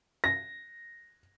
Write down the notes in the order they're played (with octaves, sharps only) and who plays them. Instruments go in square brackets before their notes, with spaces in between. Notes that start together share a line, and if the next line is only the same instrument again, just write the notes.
[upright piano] A#6